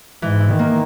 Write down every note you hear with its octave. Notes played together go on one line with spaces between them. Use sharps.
G#2 E3
E4
D#3
A#3